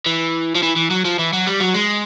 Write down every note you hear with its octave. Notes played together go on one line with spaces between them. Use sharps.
E3
F3
E3
E3
F#3
F3
E3
F#3
G3
F#3
G#3